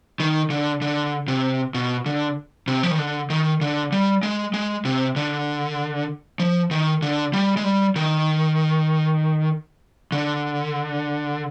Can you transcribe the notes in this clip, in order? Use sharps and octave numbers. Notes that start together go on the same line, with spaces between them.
D#3
D3
D3
C3
B2
D3
C3
F3
D#3
D3
D#3
D3
G3
G#3
G#3
C3
D3
F3
D#3
D3
G3
G#3
G3
D#3
D3